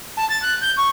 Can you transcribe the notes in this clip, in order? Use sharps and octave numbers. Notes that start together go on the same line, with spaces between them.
A5
A6
F#6
G6
C#6